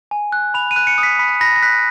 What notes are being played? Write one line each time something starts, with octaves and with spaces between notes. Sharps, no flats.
G#5
F#6
B5 F7
D#7
F#6
C#7
D#6
B6
B5 B6
B5 A#6
A#6
F#6 B6